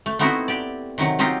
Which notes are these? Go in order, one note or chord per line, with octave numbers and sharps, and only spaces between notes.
A3
A3 B3 C4 D#4 E4 F#4
G4 D5
C3 D#3 F#3
F#3 C4 D#4 F4 G4